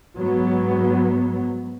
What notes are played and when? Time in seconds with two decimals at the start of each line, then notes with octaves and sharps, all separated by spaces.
0.17 G#2 F#3 B3